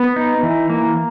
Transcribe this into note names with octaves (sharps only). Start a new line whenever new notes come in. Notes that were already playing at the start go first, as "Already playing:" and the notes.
Already playing: B3
D#4
E3
A#3